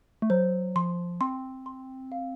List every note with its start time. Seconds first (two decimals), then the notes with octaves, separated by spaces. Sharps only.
0.22 A3
0.30 F#3 C5
0.76 F3 C6
1.21 C4 C6
1.66 C6
2.12 F5